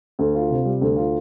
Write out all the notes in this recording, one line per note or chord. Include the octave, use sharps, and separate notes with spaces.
D2
F4
C3
G3
D2
F4